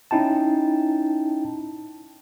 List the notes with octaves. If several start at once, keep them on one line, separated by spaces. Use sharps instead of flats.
C#4 D#4 E4 G5 A5